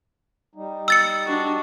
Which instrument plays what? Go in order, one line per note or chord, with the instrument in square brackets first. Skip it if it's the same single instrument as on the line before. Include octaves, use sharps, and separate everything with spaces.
[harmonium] G3 D#4
[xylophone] E6 A6 C#7
[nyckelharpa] D4 F#4